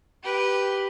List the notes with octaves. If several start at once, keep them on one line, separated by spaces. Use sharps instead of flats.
G4 B4